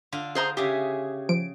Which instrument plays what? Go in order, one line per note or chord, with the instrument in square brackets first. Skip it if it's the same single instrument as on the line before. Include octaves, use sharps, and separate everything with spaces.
[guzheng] D3 F4
[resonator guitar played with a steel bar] G#4 C5 A#5
[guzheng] C#3 G#4 E5 [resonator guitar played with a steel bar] G4
[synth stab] F3 D7